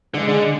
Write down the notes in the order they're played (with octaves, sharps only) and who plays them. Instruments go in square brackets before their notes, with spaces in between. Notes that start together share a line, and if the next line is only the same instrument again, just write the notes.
[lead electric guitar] D3 [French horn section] G#3
[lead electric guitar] D3